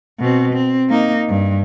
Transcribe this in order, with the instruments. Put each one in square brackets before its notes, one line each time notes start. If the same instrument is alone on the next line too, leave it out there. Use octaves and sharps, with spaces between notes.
[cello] B2 C4
C4
A#3 D#4
G2